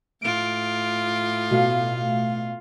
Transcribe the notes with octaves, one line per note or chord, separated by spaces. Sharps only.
A2 F4 D7
B2 A3 F5